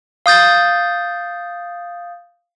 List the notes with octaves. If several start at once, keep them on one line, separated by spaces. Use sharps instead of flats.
F5 D#6 G6 A6